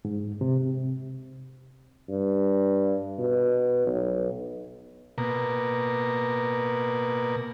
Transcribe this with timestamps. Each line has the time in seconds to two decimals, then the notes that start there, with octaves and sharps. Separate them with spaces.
0.05 G#2
0.41 C3
2.09 G2
3.19 B2
3.86 B1
5.18 B2 A#3